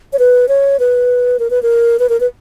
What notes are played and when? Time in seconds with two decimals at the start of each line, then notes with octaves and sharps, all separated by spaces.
0.13 C#5
0.19 B4
0.48 C#5
0.79 B4
1.39 A#4
1.50 B4
1.63 A#4
1.99 B4
2.09 A#4
2.20 B4